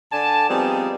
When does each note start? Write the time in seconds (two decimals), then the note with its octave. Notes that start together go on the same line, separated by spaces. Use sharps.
0.12 D3 D5 G#5 A5
0.49 F3 G3 B3 C4 D#4 G#4